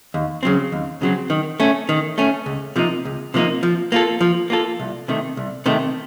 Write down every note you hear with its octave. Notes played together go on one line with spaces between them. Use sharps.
D#2
C#3 F#3 C4
D#2
C#3 F#3 C4
D#3
A3 C#4
D#3
A3 C#4
C#2
C3 F3 A#3 D#4
C#2
C3 F3 A#3 D#4
F3
A#3 F4 A4
F3
A#3 F4 A4
C2
C3 D#3 A3
C2
C3 D#3 A3